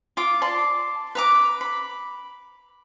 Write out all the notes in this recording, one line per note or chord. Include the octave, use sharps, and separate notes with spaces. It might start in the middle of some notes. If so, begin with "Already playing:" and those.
F4 D6
D5 A5 C6
B4 A#5 D6
B5